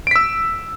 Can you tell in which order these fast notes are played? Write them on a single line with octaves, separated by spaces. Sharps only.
D7 B6 E6